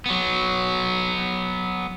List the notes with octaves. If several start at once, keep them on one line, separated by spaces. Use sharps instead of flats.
F#3 B3